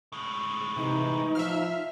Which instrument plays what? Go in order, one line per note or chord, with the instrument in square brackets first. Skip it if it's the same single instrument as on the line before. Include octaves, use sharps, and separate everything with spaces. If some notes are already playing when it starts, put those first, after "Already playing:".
[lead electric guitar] A2 G#3
[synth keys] C3 [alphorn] E3 [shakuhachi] D#4
[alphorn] F3 [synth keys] E5 F5 F6